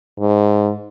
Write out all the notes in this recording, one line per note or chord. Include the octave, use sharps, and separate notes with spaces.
G#2